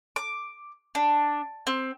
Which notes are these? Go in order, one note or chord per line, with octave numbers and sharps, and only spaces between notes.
D6
D4
C4